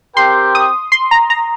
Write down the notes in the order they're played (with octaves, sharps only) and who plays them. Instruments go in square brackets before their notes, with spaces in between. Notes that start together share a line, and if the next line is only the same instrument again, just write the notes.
[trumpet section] C4 G4 A#4 G5 [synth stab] C6
[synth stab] D#6
C6
A#5
A#5